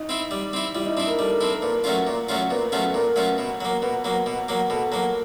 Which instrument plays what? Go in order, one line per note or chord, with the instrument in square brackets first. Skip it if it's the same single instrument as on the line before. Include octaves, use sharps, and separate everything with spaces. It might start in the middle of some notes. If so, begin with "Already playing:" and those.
Already playing: [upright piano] D#4 D#5
[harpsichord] C4 E4
G3
C4 E4
[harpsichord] G3 [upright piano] E4 E5
[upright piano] D#4 D#5
[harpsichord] C4 E4 [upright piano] D4 D5
[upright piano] A#4
[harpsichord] G3 [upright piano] A4
[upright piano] A#4
[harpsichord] C4 E4 [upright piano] A4
[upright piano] A#4
[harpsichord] A#2 [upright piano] B4
[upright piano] A#4
[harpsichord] F#3 A3 C#4 F4
A#2
F#3 A3 C#4 F4
[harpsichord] A#2 [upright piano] B3 B4
[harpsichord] F#3 A3 C#4 F4 [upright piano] A4
[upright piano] B4
[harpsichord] A#2 [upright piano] A#4
[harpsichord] F#3 A3 C#4 F4
B2
F#3 A#3
[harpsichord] B2 [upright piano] B3 B4
[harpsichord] F#3 A#3
B2
F#3 A#3
[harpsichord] B2 [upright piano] A4
[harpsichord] F#3 A#3 [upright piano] A#4